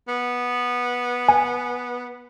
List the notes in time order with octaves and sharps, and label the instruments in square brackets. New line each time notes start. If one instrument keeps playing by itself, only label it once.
[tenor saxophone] B3
[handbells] G#5